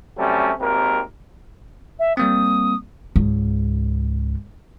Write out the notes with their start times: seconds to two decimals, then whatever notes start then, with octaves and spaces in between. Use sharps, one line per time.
0.18 C3 F#3 G3 A3 C#4
0.59 G#1 D#2 C3 C4 A#4
1.99 E5
2.17 G3 A#3 C4 D#6
3.16 C#2 G#2